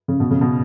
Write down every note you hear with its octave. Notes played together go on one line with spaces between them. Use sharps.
C#3
B2
C#3
B2